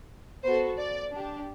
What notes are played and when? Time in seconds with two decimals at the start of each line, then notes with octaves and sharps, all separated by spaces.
0.44 B3 F#4 A4 C5
0.78 D5
1.13 D4 G4